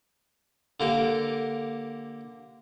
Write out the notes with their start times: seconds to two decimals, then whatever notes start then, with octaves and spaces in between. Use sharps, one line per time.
0.80 D3 A#3 G4